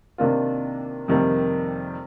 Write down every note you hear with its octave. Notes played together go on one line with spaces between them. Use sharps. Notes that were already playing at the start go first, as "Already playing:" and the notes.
C3 D#3 A#3 D4 F4
F2 C3 D#3 G3 A#3